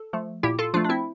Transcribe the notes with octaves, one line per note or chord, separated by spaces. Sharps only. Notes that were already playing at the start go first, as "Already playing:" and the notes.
Already playing: A4
F3 A3
A#2 E4 G4
F4 A4
F3 A3 D4 F4
D4
C4 E4